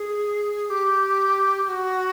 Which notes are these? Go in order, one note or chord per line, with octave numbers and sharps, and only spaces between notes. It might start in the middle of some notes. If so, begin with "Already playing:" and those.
Already playing: G#4
G#4
G4
G4
F#4